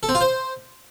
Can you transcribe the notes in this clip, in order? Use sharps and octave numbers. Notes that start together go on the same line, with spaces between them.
A4
C4
F4
C5